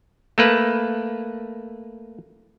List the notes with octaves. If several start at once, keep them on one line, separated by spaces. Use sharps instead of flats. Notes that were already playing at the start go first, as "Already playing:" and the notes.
A3 A#3 B4